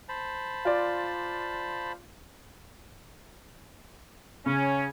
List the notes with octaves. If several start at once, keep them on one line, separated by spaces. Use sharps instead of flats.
C5 A5 B5
F4 D5
C#3 C#4